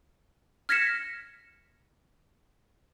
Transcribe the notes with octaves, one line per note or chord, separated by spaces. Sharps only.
F6 G#6 A#6 B6 C#7 E7